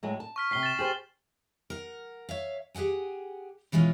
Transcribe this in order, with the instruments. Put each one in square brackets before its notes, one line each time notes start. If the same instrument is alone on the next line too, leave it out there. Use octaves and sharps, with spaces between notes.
[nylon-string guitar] A2 F#3 G#3
A5
[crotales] C#6 F6 B6
[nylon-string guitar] E2 C3 [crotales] B6 C7 G7
[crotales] A6 E7
[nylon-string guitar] G4 G#4 C5 [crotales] F#7
[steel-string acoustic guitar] A#4 F#5
C#5 E5 F5
G4 G#4 C5 F#5 G#5
B2 E3 G#3 C#4 F4